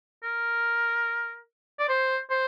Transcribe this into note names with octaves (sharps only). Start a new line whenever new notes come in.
A#4
D5
C5
C5